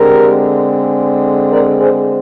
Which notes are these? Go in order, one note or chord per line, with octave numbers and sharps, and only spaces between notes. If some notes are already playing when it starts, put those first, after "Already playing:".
Already playing: D3 G#3 C4 G4 A#4
A#4 D5
G#4 C5